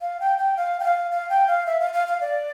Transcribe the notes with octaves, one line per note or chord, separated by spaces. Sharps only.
F5
G5
G5
F5
G5
F5
F5
G5
F5
E5
F5
F5
F5
D5